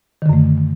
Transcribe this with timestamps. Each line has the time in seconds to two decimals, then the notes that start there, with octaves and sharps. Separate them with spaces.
0.22 D#3
0.26 D3
0.29 F#2
0.33 A3